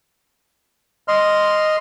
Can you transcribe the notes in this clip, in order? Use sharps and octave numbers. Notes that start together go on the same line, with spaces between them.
D#5 C6 F6